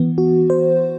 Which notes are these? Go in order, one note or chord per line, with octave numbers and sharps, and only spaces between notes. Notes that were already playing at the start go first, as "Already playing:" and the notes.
Already playing: E3 B3
F#4
C5